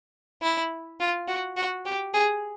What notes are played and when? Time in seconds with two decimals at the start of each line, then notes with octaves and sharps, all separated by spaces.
0.42 E4
1.00 F4
1.28 F#4
1.56 F#4
1.85 G4
2.14 G#4